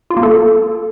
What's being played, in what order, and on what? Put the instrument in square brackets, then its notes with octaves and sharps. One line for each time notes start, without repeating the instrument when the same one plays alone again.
[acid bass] F4
A#3
A4